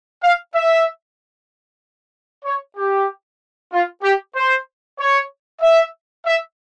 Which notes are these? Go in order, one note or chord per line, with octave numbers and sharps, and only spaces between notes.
F5
E5
C#5
G4
F4
G4
C5
C#5
E5
E5